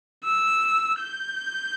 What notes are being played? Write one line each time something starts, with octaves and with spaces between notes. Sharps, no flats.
E6
G6